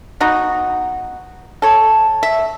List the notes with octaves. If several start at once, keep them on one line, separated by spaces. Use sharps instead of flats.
B3 D#4 F#4
A4 C#5
E5